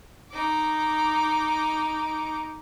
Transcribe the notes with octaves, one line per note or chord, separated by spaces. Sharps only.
D#4 D6